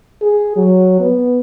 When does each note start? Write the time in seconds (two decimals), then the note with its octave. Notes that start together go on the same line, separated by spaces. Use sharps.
0.22 G#4
0.56 F#3
1.00 B3